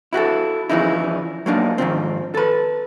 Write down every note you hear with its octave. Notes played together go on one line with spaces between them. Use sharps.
E4 F#4 G4 A4
E2 C#3 E3 F3 D#4 E4
F#3 A#3 D4 D#4
G#2 D#3 F3 C4
A4 B4